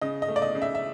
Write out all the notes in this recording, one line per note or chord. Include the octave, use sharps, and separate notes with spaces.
C#3 D#5
D#5
A3
D5
D#5
C#3
E5
E5